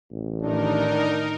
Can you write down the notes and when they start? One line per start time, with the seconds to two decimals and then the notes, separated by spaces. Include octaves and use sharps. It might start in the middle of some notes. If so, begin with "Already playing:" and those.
0.12 A1
0.42 A2 D#3 D4 D#4 A#4